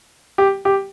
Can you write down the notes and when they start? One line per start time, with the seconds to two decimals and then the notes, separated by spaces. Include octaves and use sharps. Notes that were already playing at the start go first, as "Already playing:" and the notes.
0.38 G4
0.65 G4